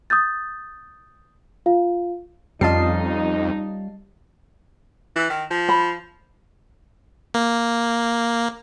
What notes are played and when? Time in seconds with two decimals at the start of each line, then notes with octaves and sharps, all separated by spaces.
0.10 D#6 E6 G6 A6
1.66 F4 F5
2.61 F2 G3 C#4 D#4 F4 D#5 A5 C7
5.16 E3
5.30 D#3
5.50 F3
5.69 B5
7.34 A#3